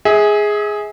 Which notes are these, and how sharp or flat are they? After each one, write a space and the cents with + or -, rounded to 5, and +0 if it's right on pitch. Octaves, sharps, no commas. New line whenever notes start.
G#4 +0 E5 -40